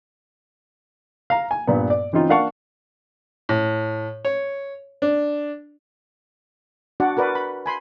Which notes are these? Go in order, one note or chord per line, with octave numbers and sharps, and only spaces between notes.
F5 A#5
G#5
G2 A#2 B3
D5
E3 C4 C#4 D#4 F4
D4 A#4 F5 F#5 A5 C#6
A2
C#5
D4
D4 F#4 D5 F#5
F#4 A#4 B4 D5
B5
G#5 B5 C6